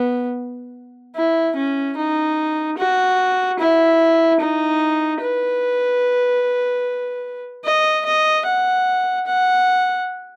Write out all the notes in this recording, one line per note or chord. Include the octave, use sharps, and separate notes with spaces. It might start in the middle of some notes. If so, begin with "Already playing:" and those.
Already playing: B3
E4
C#4
D#4
F#4
E4
D#4
B4
D#5
D#5
F#5
F#5